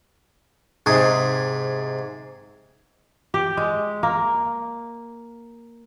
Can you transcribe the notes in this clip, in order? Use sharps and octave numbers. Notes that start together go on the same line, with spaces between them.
G#2 C3 G#4
G4
G#3
A#3